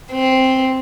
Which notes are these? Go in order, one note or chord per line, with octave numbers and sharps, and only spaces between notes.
C4